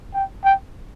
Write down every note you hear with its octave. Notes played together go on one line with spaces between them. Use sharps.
G5
G5